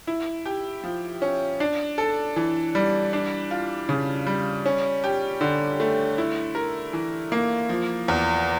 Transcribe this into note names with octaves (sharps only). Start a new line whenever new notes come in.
E4
G4
F3
C#4
D4
A4
E3
G3
D4
F4
C#3
G3
C#4
G4
D3
A3
E4
A#4
E3
A#3
F3
E2